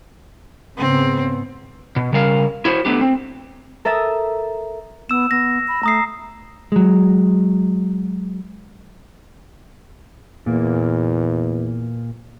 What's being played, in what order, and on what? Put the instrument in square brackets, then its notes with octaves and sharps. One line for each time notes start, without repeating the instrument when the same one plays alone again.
[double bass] G#2 B3 [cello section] C#3 [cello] C4
[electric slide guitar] B2
C#3 G3 A#4 F5
E4 F#4 C5
A3 B3 D4 G4
C4
[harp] A4 A#4 E5 D#6 A6 E7
[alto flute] B3 [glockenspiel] E6 E7
[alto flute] B3 [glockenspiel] A#6
[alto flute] B5
[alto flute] A3 [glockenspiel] A#5 D#6 C7
[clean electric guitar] F#3 G#3
[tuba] E2 [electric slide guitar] A#2 A#3